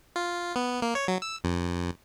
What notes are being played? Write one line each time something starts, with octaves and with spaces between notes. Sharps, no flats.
F4
B3
A#3
C#5
F#3
E6
F2